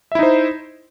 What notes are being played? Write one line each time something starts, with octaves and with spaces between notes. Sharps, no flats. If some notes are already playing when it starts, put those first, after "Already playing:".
D#4 E4 C5 E5